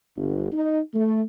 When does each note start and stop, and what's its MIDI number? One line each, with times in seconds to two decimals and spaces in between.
0.17 0.50 31
0.52 0.81 63
0.94 1.22 57